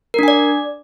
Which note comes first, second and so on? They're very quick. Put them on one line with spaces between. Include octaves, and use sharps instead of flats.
A#4 D4 G#5 D5